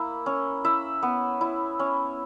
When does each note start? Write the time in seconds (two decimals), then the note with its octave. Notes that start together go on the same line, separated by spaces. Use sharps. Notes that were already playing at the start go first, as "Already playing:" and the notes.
Already playing: A#3 E4
0.26 C#4
0.65 E4 E5
1.03 B3
1.41 E4
1.79 C#4